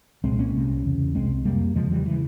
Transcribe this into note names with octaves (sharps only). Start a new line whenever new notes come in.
C2 A#2 G#3 C4
A#3 C#4
C2 C3
E2 C#3
C2 C3 G#3 C4
F2 C3 G3 A#3
E2 C#3 F3 G#3
E3 G3
C#3 E3